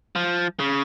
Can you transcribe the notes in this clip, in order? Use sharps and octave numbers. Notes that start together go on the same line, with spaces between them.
F3
C#3